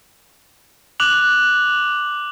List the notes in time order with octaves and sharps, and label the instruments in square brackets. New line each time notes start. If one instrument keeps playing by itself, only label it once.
[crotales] D6 F#6 F7 F#7